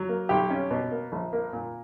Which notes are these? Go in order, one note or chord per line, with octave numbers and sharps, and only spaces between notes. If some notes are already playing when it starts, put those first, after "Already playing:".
Already playing: F#3
A#3
B1 G4
C#4
B2
A#3
A#1
A#3
A#2